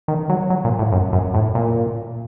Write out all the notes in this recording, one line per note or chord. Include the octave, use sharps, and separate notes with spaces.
D#3
F#3
F#3
A#2
A2
F#2
F#2
A2
A#2